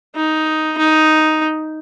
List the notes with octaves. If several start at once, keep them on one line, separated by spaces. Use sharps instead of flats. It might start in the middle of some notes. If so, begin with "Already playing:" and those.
D#4
D#4